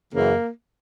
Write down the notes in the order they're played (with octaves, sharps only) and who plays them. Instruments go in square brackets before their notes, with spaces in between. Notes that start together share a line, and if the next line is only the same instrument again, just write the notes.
[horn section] F#2 C#3 E3 A#3